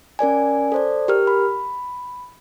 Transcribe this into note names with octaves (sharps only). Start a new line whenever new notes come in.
C#4 A#4 D5 G#5
A4 C5 D5
G4 A#4 F6
B5